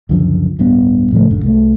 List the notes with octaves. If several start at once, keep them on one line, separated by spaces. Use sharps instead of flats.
C#2 F#2 D3 F3
D1 G2 G3 B3
A2 C#3 F3 A3
F1 G#2 D3
C2 A3